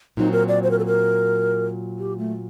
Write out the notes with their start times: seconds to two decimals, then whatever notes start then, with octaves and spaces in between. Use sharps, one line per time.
0.17 A#2 F#3 C4 D#4
0.33 A#4
0.48 D5
0.63 C5
0.71 A#4
0.79 A4
0.86 A#4
1.99 G4
2.18 A3